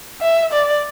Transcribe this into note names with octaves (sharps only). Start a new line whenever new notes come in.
E5
D5